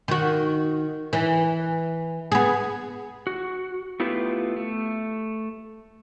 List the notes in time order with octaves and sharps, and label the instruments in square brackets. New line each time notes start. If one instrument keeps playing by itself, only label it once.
[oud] D#3 F#4
E3
B3 G#4
[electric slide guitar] F#4
A3 B3 E4 F4 G4 B4
A3